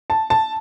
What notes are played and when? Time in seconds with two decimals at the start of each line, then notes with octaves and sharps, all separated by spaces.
0.10 A5
0.30 A5